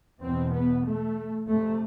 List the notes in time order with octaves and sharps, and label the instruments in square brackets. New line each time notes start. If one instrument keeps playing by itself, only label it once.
[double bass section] E2 B2 C4
B3
A3
F2 C3 A3